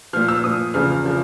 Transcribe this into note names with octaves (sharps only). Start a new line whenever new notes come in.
A#2 F3 F6
E6
A#2 F3 D#6
E2 C#3 F3 F6
C#3 F3